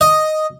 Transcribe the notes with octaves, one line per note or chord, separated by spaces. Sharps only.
D#5